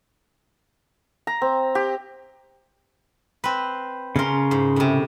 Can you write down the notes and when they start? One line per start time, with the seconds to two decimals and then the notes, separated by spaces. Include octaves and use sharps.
1.27 A#5
1.42 C4
1.75 G4
3.44 C4 B4
4.16 C#3 C#4 A#4 C6
4.51 G#2
4.76 A2 C3